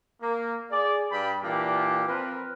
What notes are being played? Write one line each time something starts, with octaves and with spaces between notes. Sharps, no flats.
A#3
G#4 D5
G2 D4 G5 B5
A#2 E3 A#3 D4 G4
F3 C4 A#4 B4